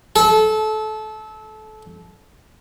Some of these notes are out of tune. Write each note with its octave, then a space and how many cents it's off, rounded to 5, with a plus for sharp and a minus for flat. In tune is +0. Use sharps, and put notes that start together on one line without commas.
A4 -25